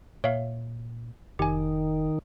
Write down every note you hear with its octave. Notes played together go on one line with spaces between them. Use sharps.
A#2 C#5 E5 F5
F1 D#3 G4 G#5